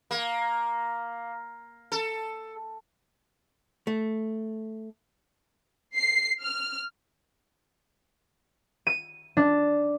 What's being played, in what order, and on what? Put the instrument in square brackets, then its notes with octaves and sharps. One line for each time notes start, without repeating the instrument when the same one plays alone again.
[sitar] A#3
A4
[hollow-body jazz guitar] A3
[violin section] C7
F6
[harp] D#7
D4